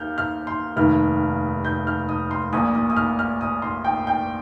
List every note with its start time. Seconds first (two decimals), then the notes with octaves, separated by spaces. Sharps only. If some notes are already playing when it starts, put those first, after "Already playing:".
Already playing: D#2 F6 G6
0.18 F6
0.47 C6
0.76 F1 D#2 D#3 F6
1.65 G6
1.87 F6
2.09 D#6
2.31 C6
2.53 A#1 A#2 A#3 D#6
2.75 D#6
2.90 D#6
2.96 F6
3.19 F6
3.41 D#6
3.62 C6
3.85 G5
4.07 G5